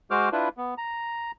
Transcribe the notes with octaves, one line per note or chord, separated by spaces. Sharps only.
G#3 F#4 C5 D6 F6
D4 E4 F4 B4
B3
A#5